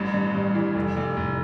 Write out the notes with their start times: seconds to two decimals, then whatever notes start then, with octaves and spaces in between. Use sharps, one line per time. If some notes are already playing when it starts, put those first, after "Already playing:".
Already playing: A1 G2
0.14 G2
0.35 G2
0.55 E3
0.75 F1
0.97 F1
1.17 F1